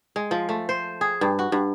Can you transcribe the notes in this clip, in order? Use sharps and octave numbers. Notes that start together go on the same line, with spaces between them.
G#3
F3
A3
C5
G#4
G2
F#4
G2